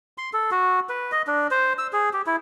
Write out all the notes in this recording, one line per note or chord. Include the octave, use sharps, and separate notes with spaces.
C6
A4
F#4
B4
D#5
D4
C5
E6
G#4
G4
E4